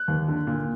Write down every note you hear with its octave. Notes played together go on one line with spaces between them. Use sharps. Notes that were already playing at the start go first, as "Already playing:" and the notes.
Already playing: F#6
D#2
D3
A#2